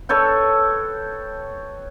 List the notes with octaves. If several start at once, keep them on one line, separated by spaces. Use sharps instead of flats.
A4 B4 C#5 G5